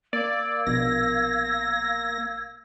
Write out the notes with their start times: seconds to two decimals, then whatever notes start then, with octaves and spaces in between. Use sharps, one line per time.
0.13 A#3 D5 F5 E6 G#6
0.67 A#1 B2 A#6